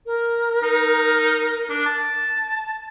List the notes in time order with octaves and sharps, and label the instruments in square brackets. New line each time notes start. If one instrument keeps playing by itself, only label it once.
[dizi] A#4
[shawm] D#4
D4
A5